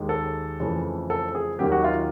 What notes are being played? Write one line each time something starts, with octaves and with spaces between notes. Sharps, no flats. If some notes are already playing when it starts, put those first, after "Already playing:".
Already playing: D#2 D#3 G#3
A4
F2 C#3 E3 A3
A4
G#4
D#2 D#3 F#3 A#3 G4
F#4
F4